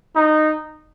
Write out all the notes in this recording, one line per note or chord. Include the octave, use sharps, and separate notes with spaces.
D#4